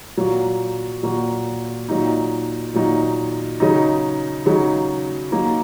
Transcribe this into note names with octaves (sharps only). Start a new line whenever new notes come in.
A#2 F#3 A#3 F#4
A#2 F#3 A#3 F#4
A#2 F#3 D#4
A#2 F#3 D#4
C#3 F#3 D#4
C#3 F#3 D#4
F#3 A#3 D#4